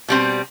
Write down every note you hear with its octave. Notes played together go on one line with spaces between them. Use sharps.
B2 G3 C4